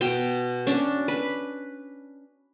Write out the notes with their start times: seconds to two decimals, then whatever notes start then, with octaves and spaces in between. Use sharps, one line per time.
0.01 B2 G5
0.67 C#4 D4
1.08 B4